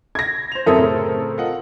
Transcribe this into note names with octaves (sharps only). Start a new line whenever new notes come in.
G#6 A#6
C5 F7
F#2 C4 A4 A#4 E5 D#6
A2 C#3
F4 D#5 F#5